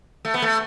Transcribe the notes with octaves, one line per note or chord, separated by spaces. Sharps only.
A3
B3
A3